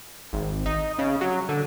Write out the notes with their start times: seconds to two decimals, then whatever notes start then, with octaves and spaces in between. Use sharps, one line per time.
0.33 G#1
0.66 D#4
0.98 C#3
1.21 F#3
1.49 D3